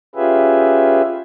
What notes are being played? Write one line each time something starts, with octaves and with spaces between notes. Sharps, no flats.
C#4 F4 G4 G#4 B4 E5